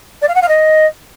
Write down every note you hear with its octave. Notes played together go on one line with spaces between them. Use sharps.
D5
F5
F#5
F5
D#5